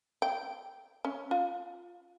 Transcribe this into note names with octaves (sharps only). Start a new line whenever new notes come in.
G5
C#4
F4